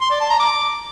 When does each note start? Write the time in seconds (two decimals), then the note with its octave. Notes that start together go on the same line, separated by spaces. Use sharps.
0.01 C6
0.11 D5
0.20 A5
0.30 A#5
0.40 D6